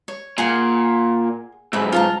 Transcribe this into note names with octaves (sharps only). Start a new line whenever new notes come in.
C#5
A#2 G#4 F#5 G#5
B1 G#2 E5 B5
F4 A5 A#5